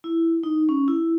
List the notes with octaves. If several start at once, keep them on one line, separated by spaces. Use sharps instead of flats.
E4
D#4
C#4
E4